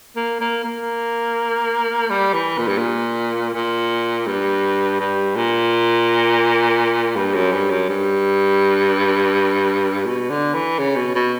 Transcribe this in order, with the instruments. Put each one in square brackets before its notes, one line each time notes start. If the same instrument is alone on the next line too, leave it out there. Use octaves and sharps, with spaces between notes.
[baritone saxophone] A#3
A#3
A#3
G3
E3
A#2
G2
A#2
A#2
G2
G2
A#2
G2
F#2
G2
F#2
G2
B2
D3
E3
C#3
B2
B2